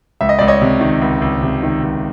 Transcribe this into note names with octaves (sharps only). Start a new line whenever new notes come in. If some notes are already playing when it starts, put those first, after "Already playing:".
C#2 E5
D#5
C#2 D5
C#5 D#5
C3
D#3
C#2
C#2
C3
D#3
C#2